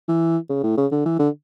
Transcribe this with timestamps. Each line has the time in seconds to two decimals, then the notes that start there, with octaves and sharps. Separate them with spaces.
0.08 E3
0.50 C#3
0.63 A2
0.77 C#3
0.92 D3
1.05 E3
1.19 D3